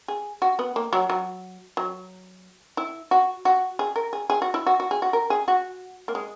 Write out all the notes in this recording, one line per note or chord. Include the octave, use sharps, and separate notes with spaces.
G#4
F#4
B3
A#3
F#3
F#3
F#3
E4
F#4
F#4
G#4
A#4
G#4
G#4
F#4
E4
F#4
F#4
G#4
F#4
A#4
G#4
F#4
A#3
G#3